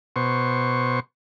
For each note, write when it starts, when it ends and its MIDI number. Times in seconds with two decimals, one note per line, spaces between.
0.16 1.00 47
0.16 1.00 72
0.16 1.00 85